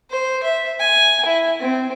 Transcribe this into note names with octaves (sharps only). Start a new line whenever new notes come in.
C5
E5
G#5
E4
C4